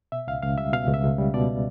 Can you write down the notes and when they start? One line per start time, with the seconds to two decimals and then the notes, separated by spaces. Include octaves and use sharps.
0.12 B2 E5
0.27 C#2 F5
0.43 C#2 F5
0.58 G3 E5
0.72 B2 F5
0.88 C#2
0.94 E5
1.04 C#2
1.18 G3
1.34 B2 D5